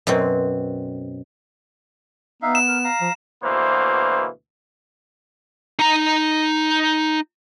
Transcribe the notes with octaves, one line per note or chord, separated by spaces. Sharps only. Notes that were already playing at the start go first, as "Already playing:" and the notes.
F#2 B2 C4
B3 D#4 E5 F5
E7
A#4
F5 A#5
F3
D2 B2 E3 A#3 C5
D#4 A#5